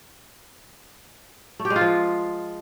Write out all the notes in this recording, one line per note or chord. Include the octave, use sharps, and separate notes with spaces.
A3
G4
G#3
F4
F3